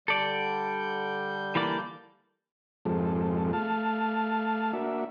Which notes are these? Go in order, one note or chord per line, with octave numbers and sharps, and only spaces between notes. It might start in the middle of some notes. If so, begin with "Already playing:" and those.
D3 G3 A4 D5 G6
E3 A#3 D5
F2 G#2 F3 G#3 C4 A4
A3 F5 A5
A#3 D4 F#4 E5